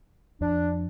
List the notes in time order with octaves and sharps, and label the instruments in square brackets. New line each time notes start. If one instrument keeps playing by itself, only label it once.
[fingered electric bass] F2 [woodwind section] D4